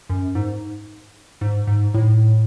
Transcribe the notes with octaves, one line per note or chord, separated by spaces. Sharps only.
F#2
G#2
G#2
G#2
A2